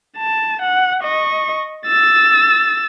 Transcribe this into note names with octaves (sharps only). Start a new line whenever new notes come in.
A5
F#5
D#5 C#6
E6 A6